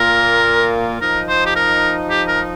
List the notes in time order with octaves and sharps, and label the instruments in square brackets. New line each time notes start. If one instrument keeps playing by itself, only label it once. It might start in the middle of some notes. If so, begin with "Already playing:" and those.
Already playing: [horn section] A#2 A#3 F4 [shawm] A#4
[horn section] F3 D#4 [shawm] A#4
[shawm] C5
G4
A#4
G4
A#4